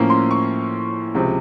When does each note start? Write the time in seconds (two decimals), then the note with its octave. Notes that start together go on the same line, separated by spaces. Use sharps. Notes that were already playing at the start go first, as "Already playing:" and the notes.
Already playing: A2 F3 A#3 C#4
0.10 C6
0.31 C#6
1.15 C#2 C3 F3